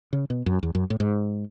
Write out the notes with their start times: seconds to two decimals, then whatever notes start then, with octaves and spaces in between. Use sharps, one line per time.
0.13 C#3
0.30 B2
0.46 F#2
0.63 E2
0.75 F#2
0.90 A2
1.00 G#2